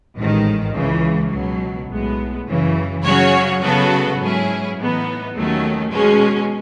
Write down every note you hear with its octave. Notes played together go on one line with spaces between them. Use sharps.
A1 G#2 D#3
C#2 C#3 E3
C#2 B2 F#3
B1 A2 G#3 B3
F#2 C#3 E3
C#3 F#3 C#4 F#4 C#5
C#3 F#3 B3 F#4 A4
G#2 F#3 C#4 E4 G#4
A2 E3 B3 D#4
D#2 D#3 F#3 A3 C#4
B2 G#3 C#4